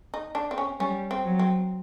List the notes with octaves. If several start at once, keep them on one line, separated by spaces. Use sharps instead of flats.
D#4
D4
C4
C#4
G3 C#4
C4
F#3
C4